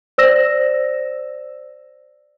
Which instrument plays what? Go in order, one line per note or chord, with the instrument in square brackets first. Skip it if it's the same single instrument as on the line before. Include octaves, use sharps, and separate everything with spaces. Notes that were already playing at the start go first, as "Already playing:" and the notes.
[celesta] C5 D5 E6 A#6 E7